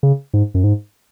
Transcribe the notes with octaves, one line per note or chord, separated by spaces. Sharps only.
C#3
G#2
F#2
G#2